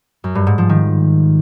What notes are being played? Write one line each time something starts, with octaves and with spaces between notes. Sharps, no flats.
F#2
G2
G#2
F3
D#3